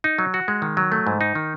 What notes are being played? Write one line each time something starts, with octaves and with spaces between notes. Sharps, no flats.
D#4
F#3
F#4
G#3
D#3
F#3
A3
G#2
D#4
D#3